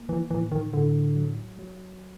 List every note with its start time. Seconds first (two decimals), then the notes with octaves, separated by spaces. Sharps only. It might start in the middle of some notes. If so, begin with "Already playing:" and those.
Already playing: A#3
0.09 E3
0.31 A2 E3
0.52 D#3
0.73 A2 D3
1.16 F#3
1.59 F#3